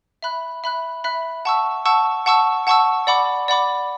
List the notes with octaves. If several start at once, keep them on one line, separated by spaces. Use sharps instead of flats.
E5 B5 F#6
E5 B5 F#6
E5 B5 F#6
F#5 A5 C#6 E6
F#5 A5 C#6 E6
F#5 A5 C#6 E6
F#5 A5 C#6 E6
D5 F#5 B5 D6
D5 F#5 B5 D6